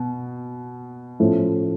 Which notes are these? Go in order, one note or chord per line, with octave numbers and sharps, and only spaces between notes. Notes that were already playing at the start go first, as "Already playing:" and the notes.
Already playing: B2
A2 F3 A3 C#4 E4